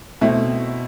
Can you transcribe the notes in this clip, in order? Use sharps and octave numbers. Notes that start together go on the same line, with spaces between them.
B2 A3 C4 E4